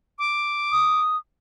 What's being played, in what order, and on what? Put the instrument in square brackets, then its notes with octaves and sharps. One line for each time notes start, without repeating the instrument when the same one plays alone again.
[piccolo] D6
[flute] D#6